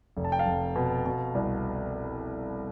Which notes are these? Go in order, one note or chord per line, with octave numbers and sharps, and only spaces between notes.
F1
A5
G5
F5 A5
F1
B2
B2
C2